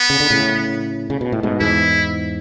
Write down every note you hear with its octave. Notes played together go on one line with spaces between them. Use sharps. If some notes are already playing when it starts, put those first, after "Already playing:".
Already playing: B3
C#3
D3
A2 C#3
C#3
B2
A2
G#2 B2
E2 G#2 E4